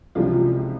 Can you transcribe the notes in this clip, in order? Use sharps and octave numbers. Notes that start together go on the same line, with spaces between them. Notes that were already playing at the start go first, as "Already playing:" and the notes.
C#2 C3 E3 F3 G3 F4